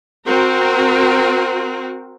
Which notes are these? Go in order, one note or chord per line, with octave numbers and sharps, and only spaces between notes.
C4 F#4 A#4